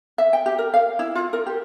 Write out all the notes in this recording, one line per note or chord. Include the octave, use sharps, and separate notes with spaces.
E5
G5
G4
A#4
F5
E4
F4
A#4
G4